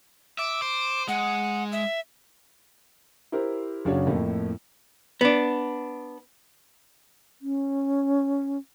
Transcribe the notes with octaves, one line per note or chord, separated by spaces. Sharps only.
E5 D6
C5
G#3 F#5
E5
E4 G4 A#4 C5
F#1 C#3 D4 F#4 C#5
F2 A2 A3 A#3
B3 D4
C#4